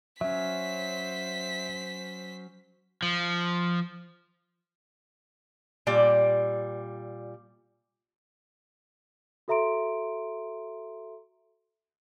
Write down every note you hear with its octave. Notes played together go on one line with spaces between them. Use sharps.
F#3 C#4 C5 E5 B6
F3
A#2 G3 D5
F#4 A4 E5 A#5 C6 D7